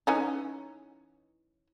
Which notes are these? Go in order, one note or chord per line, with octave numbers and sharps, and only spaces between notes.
E3 C#4 D#4